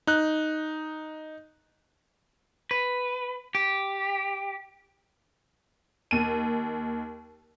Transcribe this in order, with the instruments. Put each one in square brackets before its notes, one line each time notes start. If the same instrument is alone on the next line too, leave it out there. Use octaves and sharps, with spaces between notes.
[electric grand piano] D#4 F#6
[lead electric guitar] B4
G4
[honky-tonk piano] D#2 D#7